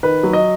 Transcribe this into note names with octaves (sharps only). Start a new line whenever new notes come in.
D#3 B4
F#3
D#5